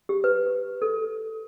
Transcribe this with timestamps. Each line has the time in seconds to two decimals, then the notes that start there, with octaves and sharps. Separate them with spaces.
0.09 G4
0.24 B4
0.82 A4